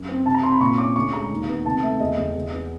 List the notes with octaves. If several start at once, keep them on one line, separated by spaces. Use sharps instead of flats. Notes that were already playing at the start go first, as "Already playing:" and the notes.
Already playing: F#2
C4
C3 A5
A#5
C4 C6
B5
A#2 C#6
C#4 D6
D2 C#6
G#3 A#5
D#2
B3
C2 A5
A3 E5
E2 D#5
E2
E2
B3